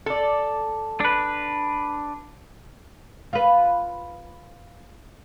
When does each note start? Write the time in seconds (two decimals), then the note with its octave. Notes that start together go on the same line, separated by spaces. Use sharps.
0.06 A4 D5
1.00 D4 B4
3.33 F4 B4